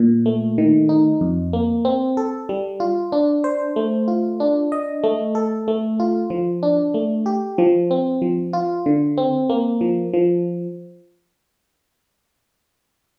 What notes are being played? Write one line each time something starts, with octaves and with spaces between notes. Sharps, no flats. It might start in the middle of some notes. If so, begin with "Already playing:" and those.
Already playing: A#2
A3
D#3
D#4
F2
A#3
C4
A4
G3
F4
D4
C5
A3
F4
D4
D#5
A3
A4
A3
F4
F3
D4
A3
G4
F3
C4
F3
F4
D3
C4
A#3
F3
F3